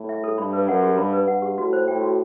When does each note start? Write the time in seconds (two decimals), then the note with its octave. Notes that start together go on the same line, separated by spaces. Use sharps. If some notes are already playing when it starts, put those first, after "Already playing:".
Already playing: A2
0.09 E5
0.24 A4
0.38 G2 B5
0.53 B4
0.68 F#2 F#5
0.83 G4
0.98 G2 B5
1.13 B4
1.27 G2 F#5
1.42 G4
1.58 A2 F#4
1.73 C5
1.88 A2 G5
2.02 F#4